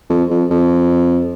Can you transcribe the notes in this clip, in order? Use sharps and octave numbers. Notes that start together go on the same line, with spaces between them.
F2
F2
F2